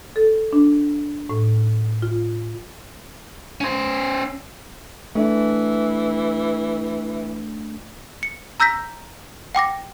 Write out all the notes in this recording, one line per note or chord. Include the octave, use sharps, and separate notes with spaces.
A4
D4
A2
F4
C#4 C5
E3 A3 D4
C#7
A#5 E6 G6 A#6 B6
F#5 G5 D6 A#6